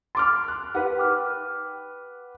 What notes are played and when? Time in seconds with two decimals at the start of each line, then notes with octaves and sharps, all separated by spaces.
0.15 C6 D6 F6 A6
0.48 F#6
0.75 D#4 G4 B4 F#5
0.98 G5 D6 F6